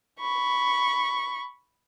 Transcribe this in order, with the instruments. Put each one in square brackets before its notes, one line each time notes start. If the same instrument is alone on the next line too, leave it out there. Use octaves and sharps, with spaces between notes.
[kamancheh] B5 C#6